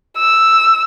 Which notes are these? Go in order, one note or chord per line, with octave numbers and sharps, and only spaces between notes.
E6